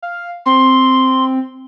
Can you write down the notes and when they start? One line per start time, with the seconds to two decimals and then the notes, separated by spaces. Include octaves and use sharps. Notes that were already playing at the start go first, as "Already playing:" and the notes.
0.02 F5
0.46 C4 C6